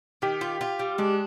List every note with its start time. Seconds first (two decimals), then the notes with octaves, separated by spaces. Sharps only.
0.22 D#3 G4
0.41 F4
0.61 F4
0.79 G3
0.98 G#3 D4